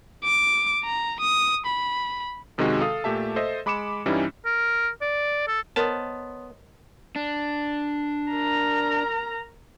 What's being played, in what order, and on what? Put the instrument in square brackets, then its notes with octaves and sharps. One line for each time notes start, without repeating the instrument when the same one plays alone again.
[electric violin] D6
A#5
D#6
B5
[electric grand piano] F#2 C3 D#3 G#3 D#4 F#4
A4 F5 D#6
A#2 A3 G4 E5 A5
A4 C5 D#5 E5
G#3 B5 D6 C#7 E7
G2 E3 G3 C#4 D#4 E4
[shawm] A#4
D5
A4
[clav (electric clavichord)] B3 A5 [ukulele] A#4 C5 D#5 [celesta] C#5 C6 D#6
[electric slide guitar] D4
[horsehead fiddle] A#4 A#5